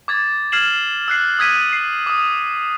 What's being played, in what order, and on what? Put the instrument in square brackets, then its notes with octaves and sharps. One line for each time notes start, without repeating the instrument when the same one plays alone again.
[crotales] D6 G#6 A6
F6 G#6 C7 E7 F#7
E6 F#6 C7
D#6 E6 G#6 B6 D#7
C7
D6 D#6